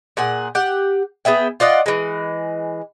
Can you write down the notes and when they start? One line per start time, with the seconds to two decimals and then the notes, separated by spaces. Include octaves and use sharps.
0.17 A#2 G#4 F#5
0.55 G4 F#5
1.25 B3 G#4 E5 G5
1.60 F4 D5 D#5 F#5
1.86 E3 G#3